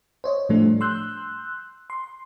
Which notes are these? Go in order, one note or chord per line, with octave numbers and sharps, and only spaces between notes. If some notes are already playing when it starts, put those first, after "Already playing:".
C5 C#5 D#5
A2 F3 G3 A3 D4
C6 E6 F#6 G6
C6